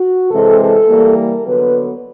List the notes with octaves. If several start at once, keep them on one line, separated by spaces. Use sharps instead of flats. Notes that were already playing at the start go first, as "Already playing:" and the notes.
Already playing: F#4
C3 E3 G#3 C4 A4
A4
E3 G3 A#3
A#4
D3 F#3 B3 B4